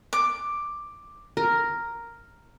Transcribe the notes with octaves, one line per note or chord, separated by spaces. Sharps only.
D6
A#4